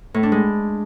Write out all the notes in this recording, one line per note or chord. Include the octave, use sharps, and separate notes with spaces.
A2
D4
G#3